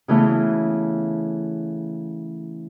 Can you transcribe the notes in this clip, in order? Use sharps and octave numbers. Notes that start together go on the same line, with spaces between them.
C#3 E3 A3 B3